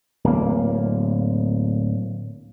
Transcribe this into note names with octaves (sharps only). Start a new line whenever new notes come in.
D1 A#3